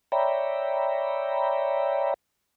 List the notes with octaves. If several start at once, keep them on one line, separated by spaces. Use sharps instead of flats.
C#5 D5 E5 G5 A#5 B5